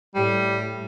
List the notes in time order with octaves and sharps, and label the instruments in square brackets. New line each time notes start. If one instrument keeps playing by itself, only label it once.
[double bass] A2 [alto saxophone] G3